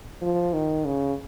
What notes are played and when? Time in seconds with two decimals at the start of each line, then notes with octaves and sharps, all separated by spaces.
0.21 F3
0.53 D#3
0.85 C#3